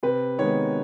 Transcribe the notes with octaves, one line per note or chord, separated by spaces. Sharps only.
C3 B4
D#3 G#3 B3 C#5